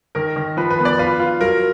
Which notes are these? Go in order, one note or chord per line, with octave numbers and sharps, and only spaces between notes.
D#3 A#4
D#3
F3 B4
B4
B3
D5
F4 B4
F4
F#3 A#4